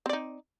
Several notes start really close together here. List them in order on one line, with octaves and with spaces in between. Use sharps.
C4 D5 D#4